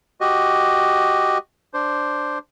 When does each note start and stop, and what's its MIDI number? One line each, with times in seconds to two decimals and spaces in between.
0.21 1.38 66
0.21 1.38 67
0.21 1.38 75
1.74 2.38 62
1.74 2.38 72